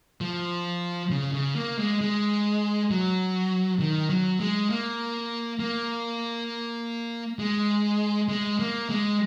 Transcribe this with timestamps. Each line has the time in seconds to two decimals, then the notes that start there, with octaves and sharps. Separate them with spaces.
0.21 F3
1.11 C#3
1.33 C#3
1.55 A#3
1.79 G#3
2.01 G#3
2.91 F#3
3.80 D#3
4.10 F#3
4.40 G#3
4.70 A#3
5.60 A#3
7.39 G#3
8.29 G#3
8.59 A#3
8.89 G#3